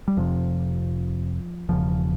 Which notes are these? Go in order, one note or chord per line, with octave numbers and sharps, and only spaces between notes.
G3
F1 F2 C3 F3
E1 E2 C#3 F3